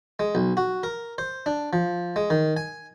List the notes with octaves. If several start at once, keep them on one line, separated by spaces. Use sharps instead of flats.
G#3
B1
F#4
A#4
C5
D4
F3
G#3
D#3
G#5